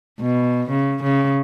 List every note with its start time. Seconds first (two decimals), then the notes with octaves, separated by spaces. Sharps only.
0.21 B2
0.70 C#3
1.03 C#3